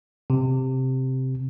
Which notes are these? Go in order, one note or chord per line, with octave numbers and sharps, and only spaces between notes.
C3